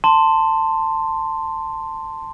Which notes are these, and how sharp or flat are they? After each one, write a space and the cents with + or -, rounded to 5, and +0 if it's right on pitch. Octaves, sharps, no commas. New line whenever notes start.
A5 +15 C6 +0